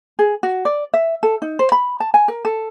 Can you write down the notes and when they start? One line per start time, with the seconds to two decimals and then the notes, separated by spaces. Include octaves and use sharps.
0.19 G#4
0.43 F#4
0.65 D5
0.94 E5
1.23 A4
1.42 D#4
1.59 C5
1.72 B5
2.00 A5
2.14 G#5
2.28 A#4
2.45 A4